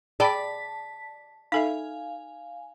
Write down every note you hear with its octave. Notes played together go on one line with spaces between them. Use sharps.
G#4 D5 G5 A5 B5 B6
D#4 A4 E5 F5 G#5